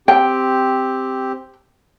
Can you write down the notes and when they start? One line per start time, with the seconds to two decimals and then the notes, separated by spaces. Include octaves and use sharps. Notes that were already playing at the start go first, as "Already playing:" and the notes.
0.08 C4 G4 G5